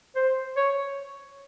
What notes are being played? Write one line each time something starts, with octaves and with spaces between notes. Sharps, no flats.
C5
C#5